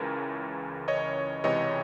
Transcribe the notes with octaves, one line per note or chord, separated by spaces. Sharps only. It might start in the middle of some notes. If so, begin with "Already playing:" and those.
Already playing: C#2 C#3 E3 A#4
C#5 D#5
C#2 C3 E3 C#5 D#5